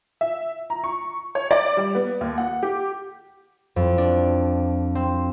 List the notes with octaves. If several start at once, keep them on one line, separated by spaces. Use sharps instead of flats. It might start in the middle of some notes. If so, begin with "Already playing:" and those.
E5
A#5
C#6
C#5
D5
G3
B3
D#2
F#5
G4
F2
D4
C4